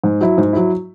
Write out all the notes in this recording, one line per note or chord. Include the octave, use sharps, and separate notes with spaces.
G#2
F#3 E4
G#2
F#3 E4